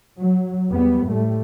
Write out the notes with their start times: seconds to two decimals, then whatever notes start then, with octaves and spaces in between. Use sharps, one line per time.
0.17 F#3
0.69 E2 G3 B3
1.09 A2 G3 A3